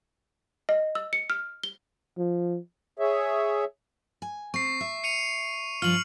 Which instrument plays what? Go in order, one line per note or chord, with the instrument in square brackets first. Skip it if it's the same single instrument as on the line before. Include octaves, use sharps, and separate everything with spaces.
[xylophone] D#5
E6
C#7
F6
G7
[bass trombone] F3
[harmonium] G#4 C#5 E5
[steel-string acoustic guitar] G#5
[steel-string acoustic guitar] C4 [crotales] C#6 C7
[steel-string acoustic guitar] E5
[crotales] C#7 D#7 F7
[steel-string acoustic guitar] G2 F3 F4 [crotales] F6 F#7